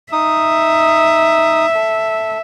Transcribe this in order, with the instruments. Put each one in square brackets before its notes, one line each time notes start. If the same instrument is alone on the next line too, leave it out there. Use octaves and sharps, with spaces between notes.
[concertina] D#4 D#6 [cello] E5
[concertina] A4